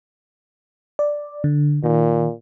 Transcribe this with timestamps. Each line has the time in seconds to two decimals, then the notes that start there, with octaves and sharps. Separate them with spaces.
0.99 D5
1.44 D3
1.84 A#2 D#3